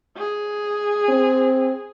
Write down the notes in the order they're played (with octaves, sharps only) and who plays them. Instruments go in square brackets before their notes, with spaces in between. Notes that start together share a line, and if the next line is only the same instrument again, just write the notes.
[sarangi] G#4
[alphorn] C4